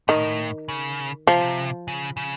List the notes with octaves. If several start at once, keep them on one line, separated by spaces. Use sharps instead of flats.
A2 D#3
C#3
C3 F3
C#3
C#3